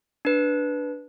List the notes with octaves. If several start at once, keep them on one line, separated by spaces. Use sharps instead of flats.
D4 B4